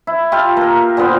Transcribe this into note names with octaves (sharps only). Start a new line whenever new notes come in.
E4
F4 G4 F5 A5
A#3 A#4
A#2 D3 B3 C5